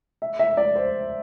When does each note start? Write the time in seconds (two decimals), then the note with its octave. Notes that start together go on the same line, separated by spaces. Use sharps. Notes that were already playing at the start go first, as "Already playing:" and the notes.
0.22 E5
0.39 E5
0.57 D5
0.76 C5